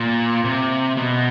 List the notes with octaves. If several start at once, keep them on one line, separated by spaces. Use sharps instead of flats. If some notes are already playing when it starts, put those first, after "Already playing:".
Already playing: A#2
C3
B2